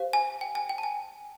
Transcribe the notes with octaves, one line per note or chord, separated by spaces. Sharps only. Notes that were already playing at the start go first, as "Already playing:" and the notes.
Already playing: G4 C5 F5
G#5
G5
G#5
G5
A5
G#5